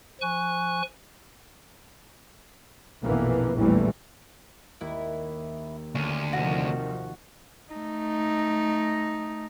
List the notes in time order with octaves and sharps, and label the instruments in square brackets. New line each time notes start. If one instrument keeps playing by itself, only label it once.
[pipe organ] F3 G#5 C#6 F#6
[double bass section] A#1 F2 B2 E3 A#3 B3
A#1 E2 A2 E3 G3 A3
[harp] D#2 [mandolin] E4
[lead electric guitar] D2 [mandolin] C#4
[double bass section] C3 D#3 F3 [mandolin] F#4
[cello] A3 D#4